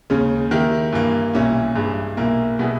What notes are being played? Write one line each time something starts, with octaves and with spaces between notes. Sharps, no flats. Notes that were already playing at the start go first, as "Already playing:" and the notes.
D#2 C#3 G#3 C#4
D#3 A#3 E4 G4
G2 E3 A#3
B1 A#2 G3 C#4 E4
G2 E3 G#3
B1 A#2 A#3 E4
B2 G3 B3 E4 G#4